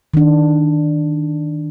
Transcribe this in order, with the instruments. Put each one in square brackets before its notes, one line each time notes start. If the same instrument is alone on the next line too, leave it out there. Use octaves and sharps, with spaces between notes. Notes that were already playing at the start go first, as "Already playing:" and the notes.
[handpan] D#3 D4